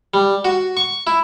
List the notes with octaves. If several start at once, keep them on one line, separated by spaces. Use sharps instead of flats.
G3
F#4
C#6
E4